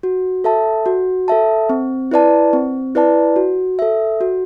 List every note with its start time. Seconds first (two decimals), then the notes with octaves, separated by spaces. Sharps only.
0.03 F#4
0.44 A4 E5 A5
0.86 F#4
1.28 A4 E5 A5
1.69 C4
2.11 E4 B4 D5 A5
2.53 C4
2.95 E4 B4 D5 A5
3.36 F#4
3.79 A4 E5
4.21 F#4